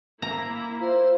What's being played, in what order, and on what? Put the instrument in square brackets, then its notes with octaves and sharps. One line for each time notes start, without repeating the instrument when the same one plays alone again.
[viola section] A#3 E4 [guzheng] A#5
[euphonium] F4 [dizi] C5